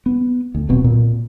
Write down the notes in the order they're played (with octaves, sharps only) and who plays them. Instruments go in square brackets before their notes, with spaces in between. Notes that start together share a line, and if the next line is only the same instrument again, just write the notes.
[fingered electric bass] B3
D2
D#1 B1 B2 C4
A#2